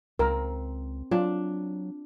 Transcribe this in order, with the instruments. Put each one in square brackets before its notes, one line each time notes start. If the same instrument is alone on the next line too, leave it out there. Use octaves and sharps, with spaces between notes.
[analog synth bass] C#2 [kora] C4 [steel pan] A#4
[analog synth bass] F#3 [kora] D4 [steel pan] F4